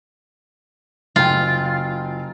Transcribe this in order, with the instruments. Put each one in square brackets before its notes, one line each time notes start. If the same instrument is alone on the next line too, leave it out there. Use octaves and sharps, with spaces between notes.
[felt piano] F#1 G5 [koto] F4